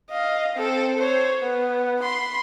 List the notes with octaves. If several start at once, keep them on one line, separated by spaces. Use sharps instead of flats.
D#5 F5
C4 A4
C5 C#5
B3
B5 C6